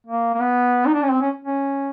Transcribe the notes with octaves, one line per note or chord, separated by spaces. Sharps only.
A#3
A#3
B3
D#4
D4
C#4
C4
C#4
C#4